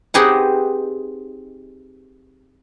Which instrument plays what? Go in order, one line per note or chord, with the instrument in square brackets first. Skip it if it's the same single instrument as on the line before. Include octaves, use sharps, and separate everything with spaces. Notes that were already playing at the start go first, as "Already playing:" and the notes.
[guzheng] C4 D#4 G4 G#4 B4 F#5